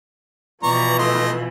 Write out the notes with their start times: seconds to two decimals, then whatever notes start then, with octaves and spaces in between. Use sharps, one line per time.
0.63 B2 E3 F3 D5 A#5 C#6
0.99 A3 D#5 C6